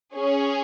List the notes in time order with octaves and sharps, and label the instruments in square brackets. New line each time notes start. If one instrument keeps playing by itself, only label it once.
[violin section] C#4 G#4 C#5